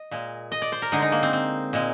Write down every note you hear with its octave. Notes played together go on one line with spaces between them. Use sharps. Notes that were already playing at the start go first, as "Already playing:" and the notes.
Already playing: D#5
A#2 G#3
D#5
D5
C5
A#4
D3 G#3 D#4
D#4
A#3
C4
C4
A#2 G#3